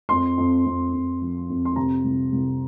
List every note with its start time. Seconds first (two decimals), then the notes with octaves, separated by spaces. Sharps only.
0.09 F2 C6
0.38 F2
0.65 F2
0.93 F2
1.21 F3
1.49 F2
1.65 C6
1.76 C3 A#5
2.04 C2
2.32 C2